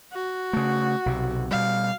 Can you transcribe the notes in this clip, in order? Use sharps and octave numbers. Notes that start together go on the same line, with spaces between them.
F#4
C#3 A3
B1 C3
B2 G3 F5